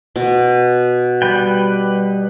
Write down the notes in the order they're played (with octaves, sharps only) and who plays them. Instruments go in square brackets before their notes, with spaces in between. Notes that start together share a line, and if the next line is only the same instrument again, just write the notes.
[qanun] B2
[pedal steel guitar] G3 B4 G5